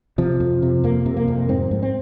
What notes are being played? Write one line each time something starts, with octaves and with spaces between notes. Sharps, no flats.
C3 F3
F2
C3
F2 A#3
C3
A#3
F2
G#2 C4
G#2
C4